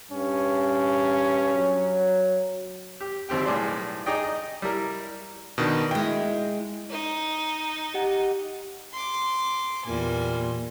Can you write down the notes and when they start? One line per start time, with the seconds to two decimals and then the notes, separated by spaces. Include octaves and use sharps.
0.12 G2 C#4
1.54 F#3
3.01 G4
3.29 G#1 D#2 C4 G4 G5
3.46 B1 A2 G3 G#4 D5 C6
4.06 D#4 G#4 D5 D#5 G5
4.24 D#5
4.62 G3 E4 A#4
5.58 B2 D#3 D4
5.91 G#3 E4 G5
6.90 D#4
7.94 G4 D#5 F#5
8.93 C6 D6
9.87 E2 A#2 G3 G#5